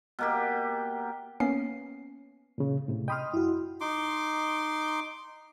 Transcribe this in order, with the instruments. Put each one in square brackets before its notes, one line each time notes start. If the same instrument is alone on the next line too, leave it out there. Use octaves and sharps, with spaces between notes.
[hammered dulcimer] B2 A#3 G4
[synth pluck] A#3 B3 C#4 C7
[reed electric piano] A#2 C#3
A2 C3
[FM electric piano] D#5 D#6 F6 [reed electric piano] G5 B5 C6
[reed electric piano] F#2 [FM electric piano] E4 F#4
[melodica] D#4 C6 D6